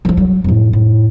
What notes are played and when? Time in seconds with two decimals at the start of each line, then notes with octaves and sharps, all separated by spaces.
0.05 F3 D4
0.17 F#3
0.44 F2 A2
0.73 A2